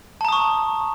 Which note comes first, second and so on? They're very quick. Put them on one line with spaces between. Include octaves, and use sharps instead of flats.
A5 A#5 D#6 C#6